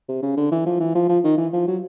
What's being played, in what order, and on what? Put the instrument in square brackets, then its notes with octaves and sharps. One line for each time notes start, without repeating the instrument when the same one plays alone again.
[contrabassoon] C3
C#3
D3
E3
F3
E3
F3
F3
D#3
E3
F3
F#3